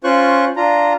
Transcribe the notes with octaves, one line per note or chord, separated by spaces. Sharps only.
C#4 F4 C5 C#6 F#6
D4 F4 A#5